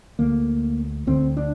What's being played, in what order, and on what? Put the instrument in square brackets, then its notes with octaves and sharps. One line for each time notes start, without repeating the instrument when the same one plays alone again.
[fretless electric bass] D2 D3 A#3
D2 D3 C4
D4